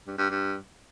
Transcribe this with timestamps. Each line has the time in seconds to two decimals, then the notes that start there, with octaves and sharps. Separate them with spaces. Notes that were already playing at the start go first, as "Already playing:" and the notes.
0.07 G2
0.19 G2
0.30 G2